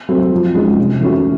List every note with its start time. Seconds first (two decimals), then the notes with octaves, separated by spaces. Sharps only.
0.09 F#3 A3 C4
0.31 F3
0.55 G#3 C#4 F#4
0.78 C3
1.01 E3 A3 C#4 F#4